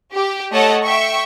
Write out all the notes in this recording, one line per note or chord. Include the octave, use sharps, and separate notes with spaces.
G4
A3 A4 C#5 D#5 F#5 A5
E5 G5 C#6